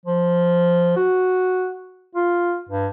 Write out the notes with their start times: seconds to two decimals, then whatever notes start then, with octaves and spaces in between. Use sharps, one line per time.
0.06 F3
0.97 F#4
2.15 F4
2.69 G2